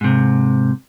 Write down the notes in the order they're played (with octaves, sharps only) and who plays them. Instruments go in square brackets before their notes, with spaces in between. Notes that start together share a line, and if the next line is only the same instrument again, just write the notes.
[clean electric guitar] G#2 C3